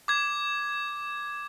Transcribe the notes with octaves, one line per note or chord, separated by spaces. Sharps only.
D6 G#6